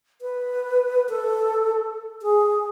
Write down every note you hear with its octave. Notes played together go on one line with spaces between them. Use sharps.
B4
A4
G#4